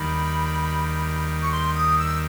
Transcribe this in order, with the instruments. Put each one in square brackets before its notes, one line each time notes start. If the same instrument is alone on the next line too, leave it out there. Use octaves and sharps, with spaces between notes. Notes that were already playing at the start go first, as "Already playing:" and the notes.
Already playing: [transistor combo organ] D#2 D#3 G3 [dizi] B5
[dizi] C#6
C6
D#6
E6